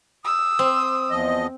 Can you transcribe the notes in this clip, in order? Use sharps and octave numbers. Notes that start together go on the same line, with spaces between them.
D#6 E6
C4
E2 F3 D#5